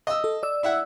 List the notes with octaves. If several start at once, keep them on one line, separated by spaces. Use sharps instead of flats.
D#5 E6
A4
D5 E6
E4 E5 F#5